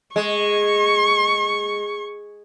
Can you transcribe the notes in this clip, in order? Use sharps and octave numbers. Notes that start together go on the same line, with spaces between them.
G#3 C#6